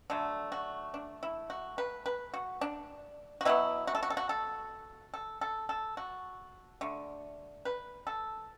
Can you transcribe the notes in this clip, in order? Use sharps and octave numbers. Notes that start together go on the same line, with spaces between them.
D3 F#3 A3 A4
F#4
D4
E4
F#4
B4
B4
F#4
D4
F#4
B2 F#3 B3 E4
F#4
A4
F#4
A4
F#4
A4
A4
A4
A4
F#4
D3 A3
B4
A4